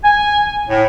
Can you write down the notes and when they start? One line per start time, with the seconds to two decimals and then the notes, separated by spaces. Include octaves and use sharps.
0.04 G#5
0.67 A2